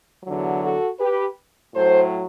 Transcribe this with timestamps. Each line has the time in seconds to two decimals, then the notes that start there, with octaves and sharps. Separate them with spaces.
0.23 E2 D3 F#3
0.61 F#4 A4
0.98 G4 B4
1.74 A2 F#3 A4 C5